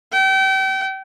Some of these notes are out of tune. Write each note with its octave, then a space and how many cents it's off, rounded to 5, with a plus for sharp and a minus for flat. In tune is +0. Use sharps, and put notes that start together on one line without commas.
G5 -35